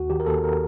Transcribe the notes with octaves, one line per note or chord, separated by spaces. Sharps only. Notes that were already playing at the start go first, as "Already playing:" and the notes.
Already playing: D#2 F#4
D#3 G4
A#4
D#2 A4
D#3 A#4